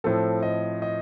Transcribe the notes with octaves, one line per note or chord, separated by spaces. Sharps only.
A2 F3 C4 A4
D#5
D#5